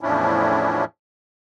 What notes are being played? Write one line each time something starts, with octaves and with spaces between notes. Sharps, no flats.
E2 A2 F3 C#4 D4 E4